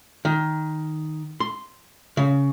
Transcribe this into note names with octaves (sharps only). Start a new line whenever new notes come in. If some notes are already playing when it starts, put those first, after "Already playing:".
D#3
C6
C#3